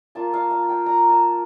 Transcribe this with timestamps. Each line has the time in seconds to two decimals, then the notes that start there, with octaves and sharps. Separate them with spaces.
0.15 A#3 F4 A5
0.33 F5
0.51 F5
0.69 G5
0.86 A#5
1.10 A5